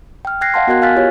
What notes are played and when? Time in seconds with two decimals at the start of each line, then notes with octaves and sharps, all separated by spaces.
0.25 G5 F6
0.41 G5 F#6 G#6 A#6 C7
0.54 D#5 F5 F#5 A5 C6
0.67 B3 F#4 A#4 D#5 F#6 G#6
0.82 F5 G#5 F6 F#6 A6 B6
0.96 F4 G4 C#5 D#5